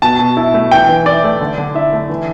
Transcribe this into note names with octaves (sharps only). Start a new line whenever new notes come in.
B2 A5
B2
E4
A3
E3 G5
E3
E4 D5
A3
D3
D3
E4 E5
A3
E3